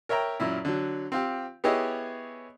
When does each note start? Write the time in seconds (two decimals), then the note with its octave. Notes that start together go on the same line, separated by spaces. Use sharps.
0.09 A#4 C#5 E5 G5 A#5
0.40 F#2 A#2 E4
0.65 D3 F#3
1.12 C4 F4 G4
1.64 B3 E4 G4 G#4 C#5 D#5